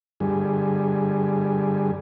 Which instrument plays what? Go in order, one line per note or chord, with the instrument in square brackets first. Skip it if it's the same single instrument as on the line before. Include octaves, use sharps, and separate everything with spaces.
[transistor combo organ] G2 D3 G3 G#4